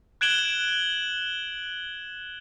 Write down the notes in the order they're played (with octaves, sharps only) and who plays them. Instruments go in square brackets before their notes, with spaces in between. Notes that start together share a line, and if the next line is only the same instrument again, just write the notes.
[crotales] F#6 G#6 D7 E7 F#7 G7